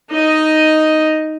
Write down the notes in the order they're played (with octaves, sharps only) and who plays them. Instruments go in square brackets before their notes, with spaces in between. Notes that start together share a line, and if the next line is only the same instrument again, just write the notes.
[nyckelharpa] D#4 D#5